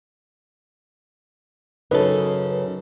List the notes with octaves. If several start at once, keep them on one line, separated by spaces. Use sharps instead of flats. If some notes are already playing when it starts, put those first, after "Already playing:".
F#2 C#3 C#4 D#4 A4 B4